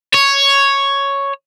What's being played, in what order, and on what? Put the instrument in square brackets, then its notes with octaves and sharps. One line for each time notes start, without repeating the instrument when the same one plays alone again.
[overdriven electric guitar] C#5